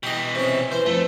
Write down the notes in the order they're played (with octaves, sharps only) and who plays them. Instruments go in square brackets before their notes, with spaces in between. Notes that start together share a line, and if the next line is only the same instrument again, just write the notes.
[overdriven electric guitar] B2 E3 [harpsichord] G4 D#5
[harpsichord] C3 C#4
[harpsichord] E3 [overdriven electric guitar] C5
[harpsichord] F2 [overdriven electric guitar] A3